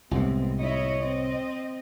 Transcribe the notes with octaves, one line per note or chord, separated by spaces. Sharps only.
C2 A2 G#3 B3 C4
E4 C#5 D#5
C4 D#5